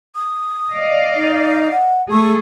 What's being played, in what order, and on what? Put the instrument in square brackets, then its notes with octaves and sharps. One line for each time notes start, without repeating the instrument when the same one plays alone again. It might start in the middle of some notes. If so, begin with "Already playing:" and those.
[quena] D#6
[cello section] D5 D#5 F5
[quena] D#4
F#5
[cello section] A3 G#4 A4 [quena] C#6